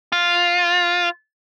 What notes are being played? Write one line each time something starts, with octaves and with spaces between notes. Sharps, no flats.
F4